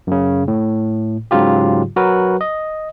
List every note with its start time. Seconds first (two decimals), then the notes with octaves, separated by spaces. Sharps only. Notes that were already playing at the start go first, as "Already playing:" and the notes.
0.07 F#2 C#3
0.48 A2
1.31 G#2 C#3 F#3 F4 G4
1.96 F#3 F#4 A#4 B4
2.41 D#5